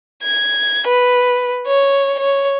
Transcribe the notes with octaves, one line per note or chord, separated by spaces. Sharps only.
G#6
B4
C#5
C#5